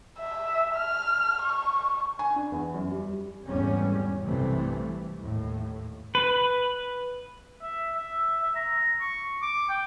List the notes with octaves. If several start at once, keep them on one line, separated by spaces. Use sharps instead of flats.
E5
F6
C#6
G#5
D4
E2
F#2
G3
G#1 E2 A2 G3 C#4
B1 G2 C3 E3 A3
D#2 A2
B4
E5
E5
E5
A#5
C#6
D6
G5